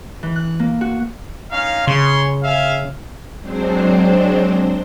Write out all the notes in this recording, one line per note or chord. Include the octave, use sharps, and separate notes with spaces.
E3
F#6
A#3
F#4
C#4 D#4 F5
C#3 C#5 C6
G#4 E5 F5
F#3 G#3 C4 D4 C5